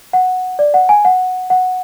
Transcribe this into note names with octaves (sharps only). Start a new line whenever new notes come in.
F#5
D5
F#5
G#5
F#5
F#5